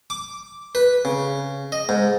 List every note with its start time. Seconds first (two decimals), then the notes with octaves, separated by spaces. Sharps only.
0.10 D6
0.75 B4
1.05 C#3
1.72 D#5
1.89 G#2